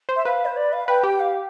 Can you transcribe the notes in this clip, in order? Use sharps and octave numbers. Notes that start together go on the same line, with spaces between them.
C5
E5
B4 F5
C5
D5
F5
B4 G5
G4
F5